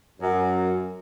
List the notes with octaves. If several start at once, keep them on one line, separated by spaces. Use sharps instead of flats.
F#2